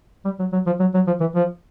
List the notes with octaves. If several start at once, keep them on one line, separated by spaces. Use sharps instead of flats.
G3
F#3
F#3
F3
F#3
F#3
F3
E3
F3